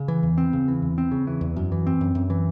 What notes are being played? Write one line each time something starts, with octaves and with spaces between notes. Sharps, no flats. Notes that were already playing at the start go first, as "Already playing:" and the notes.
Already playing: C#3
E3
E2
C4
C#3
E3
E2
C4
C#3
E3
E2
F#2
E3
C4
F#2
F#2
E3